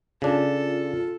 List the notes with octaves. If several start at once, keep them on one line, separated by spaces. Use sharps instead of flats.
C#3 D4 F4 A4